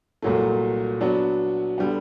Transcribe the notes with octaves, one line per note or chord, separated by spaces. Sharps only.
C2 A#2 F#3 A3
F#3 B3 D4
D3 G3 B3